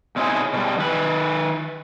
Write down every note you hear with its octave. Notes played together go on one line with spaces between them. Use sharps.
B2 C4 C#4 D#4 E4 G#4
B2 F3 G3
D#3 B4